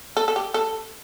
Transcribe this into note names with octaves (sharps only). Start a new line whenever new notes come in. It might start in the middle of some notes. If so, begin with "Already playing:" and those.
A4
A4
G4
A4